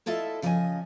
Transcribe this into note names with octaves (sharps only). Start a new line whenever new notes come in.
E4 F4 A4 D#5 E5 A5
C#3 F3 A#4 D5 D#5 G#5